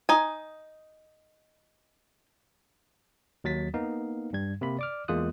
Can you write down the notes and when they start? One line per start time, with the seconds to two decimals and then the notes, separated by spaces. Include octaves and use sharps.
0.09 D#4 G#5
3.44 D#2 F#3 A6 B6
3.74 A#3 B3 D#4 F5
4.33 G2 G3 G#6
4.61 C3 A#3 B5
4.79 D5 D6 F6
5.08 E2 G#3 A#3 F4 D#6 F#6